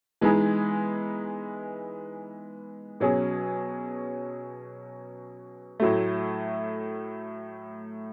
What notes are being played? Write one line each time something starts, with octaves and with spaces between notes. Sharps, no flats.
E3 G#3 B3 D#4 G#4
B2 F#3 C#4 G#4
A2 F#3 A3